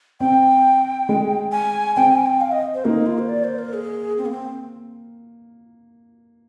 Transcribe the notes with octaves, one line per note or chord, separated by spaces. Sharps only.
C4 G5
G#3
G#5
C4 G5
G#5
G5
F5
D#5
C5
A#3 D#4
F4
C5
D5
C5
A#4
G#4
C4
A#3
C4